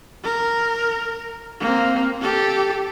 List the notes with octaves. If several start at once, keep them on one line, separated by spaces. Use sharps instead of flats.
A#4
A#3 C4
G4 A4